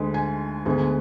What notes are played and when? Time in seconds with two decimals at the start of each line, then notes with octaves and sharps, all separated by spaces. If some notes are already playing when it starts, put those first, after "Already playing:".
Already playing: D2 D3 G#3
0.14 G#5
0.66 D2 D3 G#3 B3